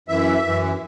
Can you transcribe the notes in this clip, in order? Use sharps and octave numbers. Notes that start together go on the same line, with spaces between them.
F#2 E3 E5
F#2 E3